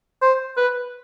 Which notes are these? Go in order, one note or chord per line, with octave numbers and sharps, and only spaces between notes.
C5
B4